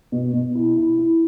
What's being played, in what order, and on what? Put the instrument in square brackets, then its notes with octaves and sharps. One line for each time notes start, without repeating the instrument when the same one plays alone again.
[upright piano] B2
B2
E4
E4
E4